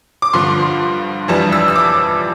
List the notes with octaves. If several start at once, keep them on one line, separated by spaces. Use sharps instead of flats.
D6
G2 D3 F3 C6
F2 E3 G3 A5
E6
E6
D6